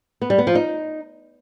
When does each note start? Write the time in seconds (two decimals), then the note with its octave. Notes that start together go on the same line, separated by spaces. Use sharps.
0.22 B3
0.30 G3
0.38 B3
0.47 F3
0.55 D#4